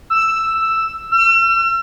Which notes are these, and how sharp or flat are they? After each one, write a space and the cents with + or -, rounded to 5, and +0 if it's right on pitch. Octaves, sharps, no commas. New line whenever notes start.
E6 +5
E6 +45